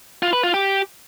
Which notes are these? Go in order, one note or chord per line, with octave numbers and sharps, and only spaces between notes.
F4
B4
F4
G4